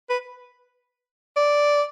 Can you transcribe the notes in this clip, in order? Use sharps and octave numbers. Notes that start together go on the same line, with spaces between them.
B4
D5